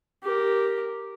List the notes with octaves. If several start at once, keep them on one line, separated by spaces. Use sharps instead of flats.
G4 A#4